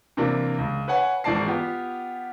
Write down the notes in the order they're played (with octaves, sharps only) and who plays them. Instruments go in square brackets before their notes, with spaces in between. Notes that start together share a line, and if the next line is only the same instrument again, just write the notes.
[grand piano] C3 E3 A#3 D4
C#2
B4 C#5 F#5 G#5
G#1 E3 G#3 D5 A5 C7
B3 F4 G4